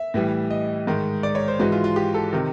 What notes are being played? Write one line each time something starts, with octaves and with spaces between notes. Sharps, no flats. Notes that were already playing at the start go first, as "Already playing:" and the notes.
Already playing: E5
A2 E3 G3
D#5
G#2 D#3 G#3
D5
C#5
C5
G#2 E3 G#3 F#4
F4
F4
G4
A4
C3 D#3